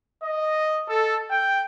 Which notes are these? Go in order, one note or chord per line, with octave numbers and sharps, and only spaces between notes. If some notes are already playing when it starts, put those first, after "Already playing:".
D#5
A4
G5